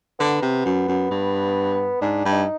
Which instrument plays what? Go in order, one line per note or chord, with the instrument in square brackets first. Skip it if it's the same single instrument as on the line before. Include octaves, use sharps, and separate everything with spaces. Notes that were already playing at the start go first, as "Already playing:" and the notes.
[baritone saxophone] D3 [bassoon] B3
[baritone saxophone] C3
F#2
F#2
G2
[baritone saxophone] G#2 [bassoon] D4
[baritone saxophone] G2
[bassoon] D#4